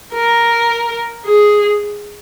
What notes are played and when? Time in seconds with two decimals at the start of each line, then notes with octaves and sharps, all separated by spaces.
0.14 A#4
1.26 G#4